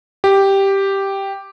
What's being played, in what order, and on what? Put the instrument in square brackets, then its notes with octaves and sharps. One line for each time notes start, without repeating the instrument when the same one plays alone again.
[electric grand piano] G4